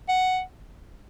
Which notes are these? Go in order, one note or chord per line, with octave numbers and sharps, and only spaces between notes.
F#5